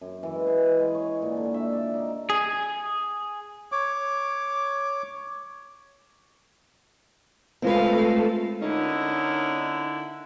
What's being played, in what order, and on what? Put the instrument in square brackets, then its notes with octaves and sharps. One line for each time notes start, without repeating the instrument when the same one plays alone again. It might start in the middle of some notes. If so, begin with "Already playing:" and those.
[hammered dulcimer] F#2
E3
G#3
G#4
B4
G#3
C#5
A#2
D3
E5
D5
D#4
[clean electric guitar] G#4
[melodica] C#5 D6
[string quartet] G#3 F5 [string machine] A3 A4 [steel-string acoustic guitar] C4 F4 B4
[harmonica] D3 E4 [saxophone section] A#3 C#4 D#4